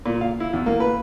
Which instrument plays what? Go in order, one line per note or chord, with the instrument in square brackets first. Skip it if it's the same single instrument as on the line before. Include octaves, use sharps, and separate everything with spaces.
[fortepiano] A#2
F5
E4
E2
A#3
B4